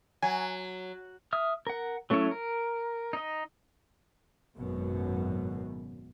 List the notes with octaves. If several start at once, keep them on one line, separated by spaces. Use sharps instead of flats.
F#3 G#5
E5 D#6 F6
A#4 F#5
F#3 A3 C#4 E4 C#5
A#4
D#4 D#5
G#1 F#2 B2